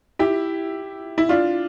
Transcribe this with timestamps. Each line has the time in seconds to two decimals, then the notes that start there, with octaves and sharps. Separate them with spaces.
0.19 E4 G4
1.18 E4
1.29 D4 F4